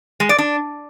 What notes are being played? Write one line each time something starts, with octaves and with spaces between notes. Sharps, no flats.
G#3
D5
D4